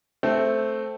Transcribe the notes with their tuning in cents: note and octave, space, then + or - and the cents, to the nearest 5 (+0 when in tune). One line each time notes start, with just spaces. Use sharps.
A3 +0 C4 +0